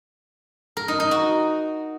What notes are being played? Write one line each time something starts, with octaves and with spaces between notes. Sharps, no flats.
A#4
D#4
D#4
F#4